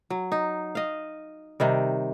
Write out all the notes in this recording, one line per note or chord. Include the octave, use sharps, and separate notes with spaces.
F#3
D#4
D#5 F5
C3 D#3 G3